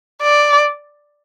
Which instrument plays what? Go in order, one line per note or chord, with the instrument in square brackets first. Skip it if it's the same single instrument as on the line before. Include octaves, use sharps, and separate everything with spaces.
[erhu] D5